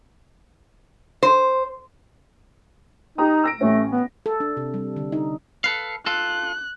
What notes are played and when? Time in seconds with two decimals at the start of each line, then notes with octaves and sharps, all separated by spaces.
1.23 C5
3.18 D#4 G4 A#5 D#6
3.44 E6 A#6 D7
3.61 A1 A3 C#4
3.92 B3
4.26 A4
4.40 D4
4.57 C3
4.74 G3
4.96 D3
5.12 D#4
5.64 A4 B4 F5
6.06 F4 A4 F#6